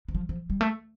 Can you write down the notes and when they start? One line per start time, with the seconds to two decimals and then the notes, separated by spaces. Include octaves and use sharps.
0.08 E3
0.15 F3
0.29 F3
0.50 G3
0.61 A3